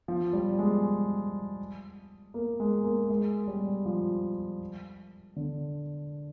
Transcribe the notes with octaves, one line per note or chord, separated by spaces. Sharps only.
F3
G3
G#3
A#3
G#3
A#3
G#3
G3
F3
D3